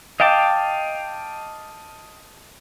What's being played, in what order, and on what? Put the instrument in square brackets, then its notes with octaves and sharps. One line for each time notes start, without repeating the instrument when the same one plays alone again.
[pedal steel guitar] D#5 F5 G5 A5 D6